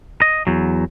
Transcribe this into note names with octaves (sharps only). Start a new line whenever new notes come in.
D#5
E2 F#3